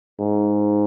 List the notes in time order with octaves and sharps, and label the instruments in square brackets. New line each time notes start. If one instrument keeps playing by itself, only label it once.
[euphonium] G#2